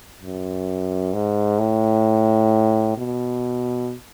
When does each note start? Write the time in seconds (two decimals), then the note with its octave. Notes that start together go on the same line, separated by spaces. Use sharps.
0.21 F#2
1.13 G#2
1.59 A2
2.97 B2